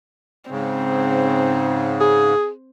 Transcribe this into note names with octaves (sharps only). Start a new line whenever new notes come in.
G#2 C#3 C4
G#4